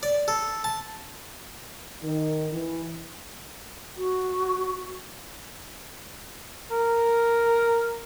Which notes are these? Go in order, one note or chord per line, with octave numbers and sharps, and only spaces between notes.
D5
A4
A5
D#3
E3
F#4
A#4